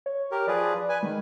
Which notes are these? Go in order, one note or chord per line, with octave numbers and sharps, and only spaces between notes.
C#5
G4 A#4
F3 G#4 B4 D5
B4 G#5
D#3 G#3